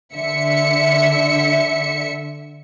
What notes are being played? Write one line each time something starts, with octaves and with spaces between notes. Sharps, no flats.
D3 E5 C#7